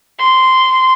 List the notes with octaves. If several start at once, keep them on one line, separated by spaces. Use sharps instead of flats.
C6